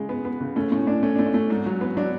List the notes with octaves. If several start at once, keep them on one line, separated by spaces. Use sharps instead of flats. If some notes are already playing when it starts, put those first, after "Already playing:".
Already playing: C#3 G#3
B3
B3
C#3
A3 C#4
A2 C#4
A2 D4
A3 C#4
A3 D4
C#4
A3
G#2
F#3
B3
F#3 D4